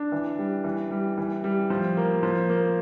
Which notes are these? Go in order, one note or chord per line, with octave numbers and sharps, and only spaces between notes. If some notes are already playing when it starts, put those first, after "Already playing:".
Already playing: D4
E3
G3
E3
G3
E3
G3
F3
A#3
F3
A#3